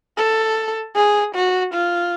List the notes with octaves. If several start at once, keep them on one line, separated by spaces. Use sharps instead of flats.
A4
G#4
F#4
F4